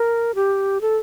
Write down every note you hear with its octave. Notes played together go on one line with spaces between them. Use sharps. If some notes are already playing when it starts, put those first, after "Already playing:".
Already playing: A#4
G4
A4